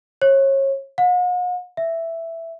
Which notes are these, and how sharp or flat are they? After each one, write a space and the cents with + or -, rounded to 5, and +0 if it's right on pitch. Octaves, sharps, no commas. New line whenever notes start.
C#5 -30
F#5 -45
E5 +5